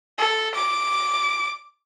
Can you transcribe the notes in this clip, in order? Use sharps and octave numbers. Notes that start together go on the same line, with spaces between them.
A4
D6